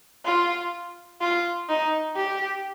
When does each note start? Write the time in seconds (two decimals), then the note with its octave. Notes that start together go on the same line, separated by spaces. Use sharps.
0.25 F4
1.21 F4
1.69 D#4
2.16 G4